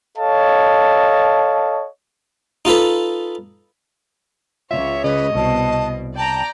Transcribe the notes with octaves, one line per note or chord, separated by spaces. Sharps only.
A4 C#5 D#5 F5 A5
D#4 F4 A4 B4
C#2 F4 C#5 E5
C#3 B4 D#5
C2 B2 A5
D5 G5 A5 A#5